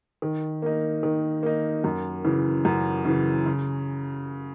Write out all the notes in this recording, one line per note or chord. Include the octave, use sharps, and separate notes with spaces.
D#3
A#3 D#4
D#3
A#3 D#4
F#2
C#3 E3
F#2
C#3 E3
C#3